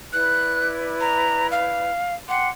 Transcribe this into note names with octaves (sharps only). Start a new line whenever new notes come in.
E4 B4 D5 F#6
A#5
F5
F#5 G5 C6 D6